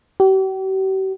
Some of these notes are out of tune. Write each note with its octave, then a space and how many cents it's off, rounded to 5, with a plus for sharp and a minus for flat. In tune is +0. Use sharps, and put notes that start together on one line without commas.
G4 -45